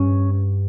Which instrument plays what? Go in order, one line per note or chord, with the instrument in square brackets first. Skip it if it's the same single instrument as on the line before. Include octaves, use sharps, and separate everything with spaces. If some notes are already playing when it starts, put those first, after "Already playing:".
Already playing: [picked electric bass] G2 C#4